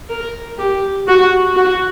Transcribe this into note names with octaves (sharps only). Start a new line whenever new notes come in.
A#4
G4
F#4
F#4